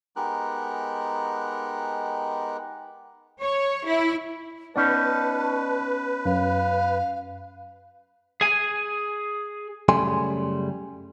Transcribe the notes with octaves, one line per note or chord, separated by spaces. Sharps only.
G#3 B3 D#4 G4 A#4 F#6
C#5
E4
B3 C#4 D#4 B4 D5 A5
F#2 F5
G#4 G#5
F#2 C#3 G3 A3 G#5 C6